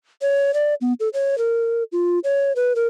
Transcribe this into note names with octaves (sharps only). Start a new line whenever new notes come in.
C#5
D5
B3
A4
C#5
A#4
F4
C#5
B4
A#4